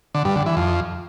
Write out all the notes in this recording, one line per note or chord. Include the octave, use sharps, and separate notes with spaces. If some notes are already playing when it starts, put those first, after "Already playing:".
D3
G2
D3
E3
F2